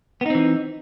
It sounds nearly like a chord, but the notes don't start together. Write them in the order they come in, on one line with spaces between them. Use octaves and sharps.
B3 D#4 C4 E3